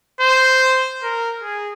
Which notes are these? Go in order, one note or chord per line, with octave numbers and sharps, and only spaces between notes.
C5
A#4
G#4